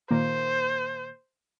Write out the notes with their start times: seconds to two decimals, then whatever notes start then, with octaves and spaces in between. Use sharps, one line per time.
0.11 A#2 D#3 A#3 C5